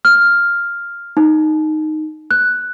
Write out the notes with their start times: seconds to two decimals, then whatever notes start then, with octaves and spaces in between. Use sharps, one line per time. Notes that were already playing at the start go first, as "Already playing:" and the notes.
0.05 F6
1.17 D#4
2.31 F#6